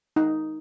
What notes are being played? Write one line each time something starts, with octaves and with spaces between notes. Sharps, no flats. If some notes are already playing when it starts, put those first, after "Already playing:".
D#4